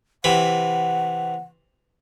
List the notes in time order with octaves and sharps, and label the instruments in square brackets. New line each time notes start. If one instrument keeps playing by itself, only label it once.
[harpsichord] C3 E3 B5 [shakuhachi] F#5